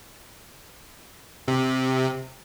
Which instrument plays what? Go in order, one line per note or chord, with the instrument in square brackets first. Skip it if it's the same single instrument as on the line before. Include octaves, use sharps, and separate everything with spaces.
[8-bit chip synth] C3